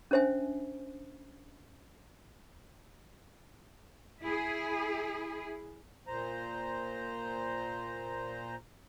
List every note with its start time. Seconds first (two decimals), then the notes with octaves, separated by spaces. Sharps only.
0.11 C#4 D4 C5 E5 G#5
4.21 E4 G#4
6.07 A#2 C5 A#5